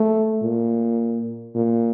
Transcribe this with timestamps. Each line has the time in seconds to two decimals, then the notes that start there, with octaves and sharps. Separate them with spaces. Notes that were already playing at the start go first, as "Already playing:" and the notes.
Already playing: A3
0.42 A#2
1.55 A#2